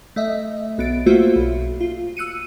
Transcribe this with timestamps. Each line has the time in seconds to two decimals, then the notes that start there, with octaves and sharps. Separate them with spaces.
0.16 A3 D#5 E5
0.78 B1 B3 A6 D7
1.06 A3 A#3 F4 F#4 C5 E5
1.36 B1
1.80 F4
2.17 E6 F#6 C#7 D#7